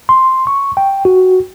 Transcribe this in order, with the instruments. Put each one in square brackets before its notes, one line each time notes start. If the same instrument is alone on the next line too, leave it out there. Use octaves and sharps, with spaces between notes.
[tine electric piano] C6
C#6
G5
F#4